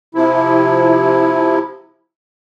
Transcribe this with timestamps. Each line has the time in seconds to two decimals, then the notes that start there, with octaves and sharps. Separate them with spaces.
0.15 C3 F3 E4